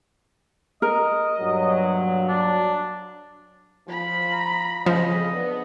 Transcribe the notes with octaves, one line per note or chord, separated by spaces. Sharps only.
A#4 D#5
G2 A#2 F#3
D4
F3 B5
A#5
F2 C#3 F3 D#5
B3 D4